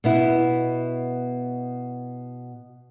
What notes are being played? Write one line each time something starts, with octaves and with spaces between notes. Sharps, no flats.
B2 B3 E4